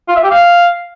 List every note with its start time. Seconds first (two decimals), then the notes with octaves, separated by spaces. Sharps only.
0.08 F4
0.16 E5
0.23 G4
0.31 F5